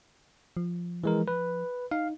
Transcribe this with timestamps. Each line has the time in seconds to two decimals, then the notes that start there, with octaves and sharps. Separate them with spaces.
0.57 F3
1.04 E3 G#3 A#4
1.28 B4
1.91 D#4 F5